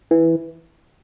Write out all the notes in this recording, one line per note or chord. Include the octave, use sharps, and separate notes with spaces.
E3